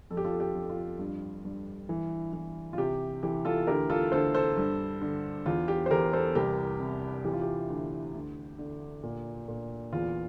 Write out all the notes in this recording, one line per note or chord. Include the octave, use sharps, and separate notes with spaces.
F2 A4
G4
F4 A4
G4
F2
F4
G2
G2
E3
E3
F4
C3 G4
E3 G4
F4 A4
D2 G4 A#4
F4 A4
D2 A4 C5
A4 C5
G2
D3
E2 F4
G4
C5
E2 G4 A#4
A4 C5
C2 G4 A#4
C3
E3 G4
F4
G4
D2
D2
D3
A#2
A#2
E2 F4